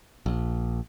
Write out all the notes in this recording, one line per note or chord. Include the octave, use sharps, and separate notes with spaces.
A#1